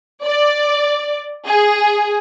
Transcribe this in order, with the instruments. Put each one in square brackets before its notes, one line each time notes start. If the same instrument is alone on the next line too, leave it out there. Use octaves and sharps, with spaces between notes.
[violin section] D5
G#4